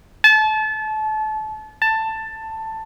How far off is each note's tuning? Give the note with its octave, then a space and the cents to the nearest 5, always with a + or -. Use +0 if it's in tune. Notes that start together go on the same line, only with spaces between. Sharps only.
A5 -30
A5 +10